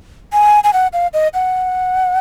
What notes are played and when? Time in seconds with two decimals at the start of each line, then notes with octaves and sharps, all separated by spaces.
0.33 G#5
0.64 G#5
0.73 F#5
0.93 F5
1.13 D#5
1.34 F#5